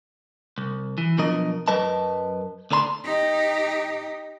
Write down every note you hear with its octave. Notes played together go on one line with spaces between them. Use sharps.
C2
E3
B2 F3 F#3 D4 A#4 D#5
F#2 F#3 A#4 B4 D#5 A5
D2 D3 D4 A#5 C6
D#4 G4